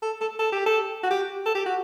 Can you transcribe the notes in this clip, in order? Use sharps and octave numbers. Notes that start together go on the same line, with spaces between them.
A4
A4
A4
G4
A4
F#4
G4
A4
G4
F#4